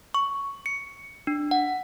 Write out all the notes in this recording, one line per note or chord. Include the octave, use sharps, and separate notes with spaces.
C#6
C#7
D4
F#5